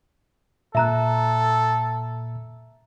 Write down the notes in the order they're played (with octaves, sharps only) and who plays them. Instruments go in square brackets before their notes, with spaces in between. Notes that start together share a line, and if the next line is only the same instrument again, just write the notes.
[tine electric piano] A#2 [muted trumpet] A4 [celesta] E5 A#5 F#6